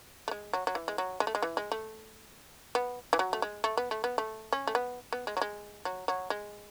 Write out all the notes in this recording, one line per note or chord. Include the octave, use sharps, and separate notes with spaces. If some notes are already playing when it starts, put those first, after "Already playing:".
A3
G#3
F#3
F#3
E3
G#3
F#3
G#3
A3
G#3
E3
G#3
A3
B3
E3
F#3
A3
G#3
A3
B3
A3
B3
A3
C#4
A3
B3
B3
G#3
F#3
G#3
F#3
F#3
G#3